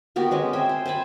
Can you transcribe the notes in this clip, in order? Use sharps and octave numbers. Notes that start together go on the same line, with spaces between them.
B3 F#4 G4 A#4
G#3 C4 C#4
C5 E5 G5 G#5
C5
C5 G#5 A5 B5